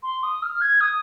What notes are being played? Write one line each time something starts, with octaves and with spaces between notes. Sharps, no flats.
C6
D#6
F6
G#6
D#6